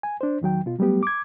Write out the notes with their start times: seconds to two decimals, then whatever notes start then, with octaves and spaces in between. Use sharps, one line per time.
0.03 G#5
0.21 D4 C5
0.41 E2 D#3 F#3 G5
0.66 B2 F4
0.79 F#3 G3 A3 B3 G4
1.03 D6 G#6